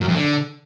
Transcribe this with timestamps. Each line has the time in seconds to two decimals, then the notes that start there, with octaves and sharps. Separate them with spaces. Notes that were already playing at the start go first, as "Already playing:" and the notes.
0.01 F#2
0.08 F2
0.15 D3